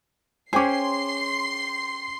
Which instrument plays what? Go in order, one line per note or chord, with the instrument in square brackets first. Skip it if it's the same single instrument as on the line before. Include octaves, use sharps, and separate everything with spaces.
[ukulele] C#4 G#4 [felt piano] C5 G5 D6 [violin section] C6 C7